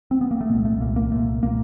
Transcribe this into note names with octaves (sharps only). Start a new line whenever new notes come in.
C4
B3
A#3
A3
C2 A#2 G#3
A3
C2 A#2 A#3
A#3
C2 A#2 A3
A#2 A#3